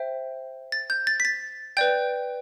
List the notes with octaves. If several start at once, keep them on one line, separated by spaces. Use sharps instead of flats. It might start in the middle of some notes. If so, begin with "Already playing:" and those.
Already playing: C5 E5 G5
A6
G6
A6
B6
A6
B4 D5 G5 G6